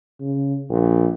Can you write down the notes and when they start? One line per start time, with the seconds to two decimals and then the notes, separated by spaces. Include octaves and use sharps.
0.20 C#3
0.70 A#1